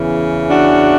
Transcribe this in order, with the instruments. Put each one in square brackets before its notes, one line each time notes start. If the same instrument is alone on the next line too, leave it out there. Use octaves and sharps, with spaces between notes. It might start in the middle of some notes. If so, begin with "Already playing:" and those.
Already playing: [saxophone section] E2 C#3 E3
D4 F#4